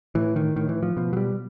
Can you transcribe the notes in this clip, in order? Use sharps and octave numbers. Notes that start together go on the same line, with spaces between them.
A2 E3
D#3
A2 D#3
E3
F3
B2 F3
F#3
G3